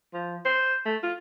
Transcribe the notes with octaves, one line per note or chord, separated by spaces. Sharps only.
F3
C5
A3
F4